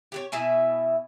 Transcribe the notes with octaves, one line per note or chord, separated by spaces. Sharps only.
G4 B4 C#5
B2 E4 E5 G#5